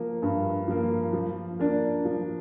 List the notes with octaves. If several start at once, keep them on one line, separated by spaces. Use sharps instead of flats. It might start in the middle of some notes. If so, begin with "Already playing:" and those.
Already playing: F3 A#3
G2
F3 A#3
F3
A#3 D4
F3